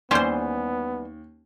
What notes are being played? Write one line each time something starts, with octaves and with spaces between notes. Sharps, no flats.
D#2 E3 G3 B3 C#4 C5 C6